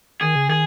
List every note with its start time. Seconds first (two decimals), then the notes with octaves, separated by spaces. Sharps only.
0.21 D#3 G#4
0.35 C#3
0.49 D#3 G#4